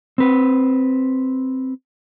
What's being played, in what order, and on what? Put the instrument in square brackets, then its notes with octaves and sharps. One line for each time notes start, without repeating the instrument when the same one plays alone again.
[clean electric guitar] C4 B4